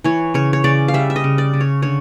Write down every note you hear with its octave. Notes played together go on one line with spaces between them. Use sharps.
E3 C#5
C#3 C#5
C#5
C#3 D5
F5
G3 E5
E5
D#5
C#3
D5
C#3
C#5
D3 C#5